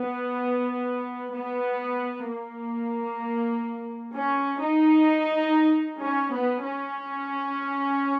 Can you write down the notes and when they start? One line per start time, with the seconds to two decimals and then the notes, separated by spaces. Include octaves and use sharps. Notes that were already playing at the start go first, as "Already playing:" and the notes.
Already playing: B3
1.33 B3
2.27 A#3
4.14 C#4
4.60 D#4
6.01 C#4
6.32 B3
6.63 C#4